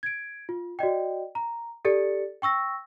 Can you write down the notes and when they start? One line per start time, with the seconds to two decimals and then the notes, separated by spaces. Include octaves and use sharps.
0.03 G#6 D7
0.49 F4
0.79 F#4 D5 D#5 G5
1.35 A#5
1.85 G4 A4 D5 A6 C#7
2.42 G5 C#6 E6 A#6